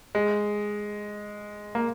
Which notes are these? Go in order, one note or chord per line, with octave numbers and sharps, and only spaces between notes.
G#3
A#3